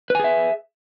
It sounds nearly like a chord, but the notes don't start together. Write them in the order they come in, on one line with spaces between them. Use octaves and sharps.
B4 G#5 G#4 E5